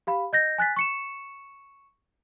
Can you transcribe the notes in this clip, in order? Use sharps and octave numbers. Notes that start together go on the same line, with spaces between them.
G4 F5 B5
D#5 G6 A#6
G#5 F#6 A6 B6
C#6 C#7 E7